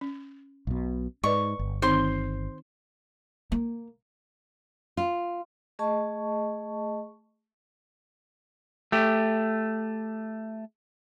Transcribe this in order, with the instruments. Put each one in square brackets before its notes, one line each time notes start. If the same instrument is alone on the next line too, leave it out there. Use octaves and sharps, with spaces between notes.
[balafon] C#4
[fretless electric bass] B1 B2
[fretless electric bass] G#2 [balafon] B4 D5 D#5 [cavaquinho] C#6
[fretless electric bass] G1
[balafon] D#3 C4 D#4 [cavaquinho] C5 C6
[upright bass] A#3
[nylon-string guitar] F4
[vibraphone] A3 G#4 D#5 A5 C#6
[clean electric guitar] A3 G4